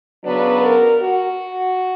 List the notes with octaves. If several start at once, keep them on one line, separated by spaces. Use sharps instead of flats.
C#3 F#3 B3 D4 B4
A#4
F#4